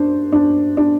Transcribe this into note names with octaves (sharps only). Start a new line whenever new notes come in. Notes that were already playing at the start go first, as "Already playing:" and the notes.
Already playing: D4 C5
D4
D4